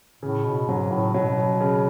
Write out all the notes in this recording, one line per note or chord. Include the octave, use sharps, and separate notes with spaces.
A2 C#3
B2
G#2 F#3
A2
B2 F#3
C#3